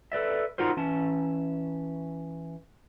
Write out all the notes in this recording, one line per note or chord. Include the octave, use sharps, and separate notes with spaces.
A4 B4 D5 E5
D#4 F4 F#4 A#4 C5
E3 C#4 A5